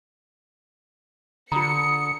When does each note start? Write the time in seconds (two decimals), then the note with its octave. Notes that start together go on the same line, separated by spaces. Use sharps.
1.52 D3 F4 A#5 D#6 C#7